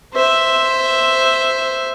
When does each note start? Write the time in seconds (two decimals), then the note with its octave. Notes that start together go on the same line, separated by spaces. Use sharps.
0.14 C5 E5